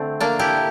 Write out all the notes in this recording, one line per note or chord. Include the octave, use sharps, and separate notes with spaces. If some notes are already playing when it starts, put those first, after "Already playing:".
Already playing: D3 A3 C4
A#3 D4
E4 G4